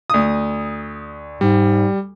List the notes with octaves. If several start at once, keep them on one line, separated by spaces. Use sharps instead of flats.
D2 D#6
G#2 G3